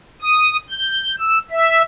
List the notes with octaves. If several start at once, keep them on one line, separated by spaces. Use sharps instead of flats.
D#6
G6
E6
E5